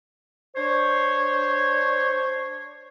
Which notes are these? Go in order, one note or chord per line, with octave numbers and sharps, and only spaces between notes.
D4 C5 C#5